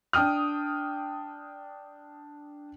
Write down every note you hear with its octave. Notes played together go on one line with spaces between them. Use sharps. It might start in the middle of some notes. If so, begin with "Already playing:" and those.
D4 G5 D#6 F6